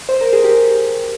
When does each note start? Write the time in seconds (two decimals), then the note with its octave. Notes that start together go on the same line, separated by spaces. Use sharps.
0.09 C5
0.21 A#4
0.33 G#4
0.43 G4 A#4